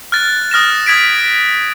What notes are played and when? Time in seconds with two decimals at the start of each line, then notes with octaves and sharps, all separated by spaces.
0.12 F6 F#6 A6
0.51 D#6 F6 A#6 E7
0.86 D#6 G#6 B6 D7